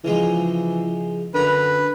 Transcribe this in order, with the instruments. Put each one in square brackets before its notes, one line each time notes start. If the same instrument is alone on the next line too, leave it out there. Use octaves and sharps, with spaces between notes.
[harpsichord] C#3 F3 G#3 [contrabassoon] E3
[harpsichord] F#2 A#5 [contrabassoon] D3 [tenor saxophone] B4